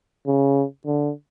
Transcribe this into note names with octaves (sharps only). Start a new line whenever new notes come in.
C#3
D3